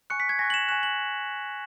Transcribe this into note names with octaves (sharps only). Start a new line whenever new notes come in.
G#5 C#6 F#6 C#7
B6
G#6
G#5 C#6 F#6 A#6
F#7
E7
G#5 C#6 F#6 E7
F#7